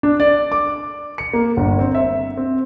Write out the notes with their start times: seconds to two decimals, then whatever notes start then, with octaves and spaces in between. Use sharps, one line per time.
0.03 D4
0.20 D5
0.52 D6
1.18 C#7
1.33 A#3
1.57 G1
1.79 C4
1.95 E5
2.37 C4